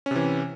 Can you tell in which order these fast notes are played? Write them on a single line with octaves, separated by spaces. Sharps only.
C#4 C3 E3